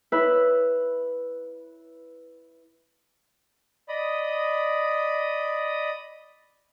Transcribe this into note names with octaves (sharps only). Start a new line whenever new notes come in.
E4 B4
D5 D#5 B5 D#6